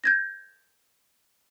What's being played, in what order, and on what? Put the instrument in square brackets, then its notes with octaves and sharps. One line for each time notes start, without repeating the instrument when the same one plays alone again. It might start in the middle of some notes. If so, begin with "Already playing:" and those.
[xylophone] G6 G#6 A#6